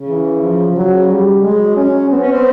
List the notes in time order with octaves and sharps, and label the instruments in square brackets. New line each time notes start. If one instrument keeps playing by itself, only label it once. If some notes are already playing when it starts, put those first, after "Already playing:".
Already playing: [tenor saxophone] C#3
[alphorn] E3
F3
[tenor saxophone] C#3 [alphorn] F#3
[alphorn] G3
[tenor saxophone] F#3 [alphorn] G#3
[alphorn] C#4
[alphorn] B3 [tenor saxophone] C4
[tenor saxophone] C#4
C4